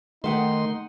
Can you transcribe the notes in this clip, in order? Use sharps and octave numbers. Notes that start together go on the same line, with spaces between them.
D#3 A3 D#4 D#5 F#5 G5 C6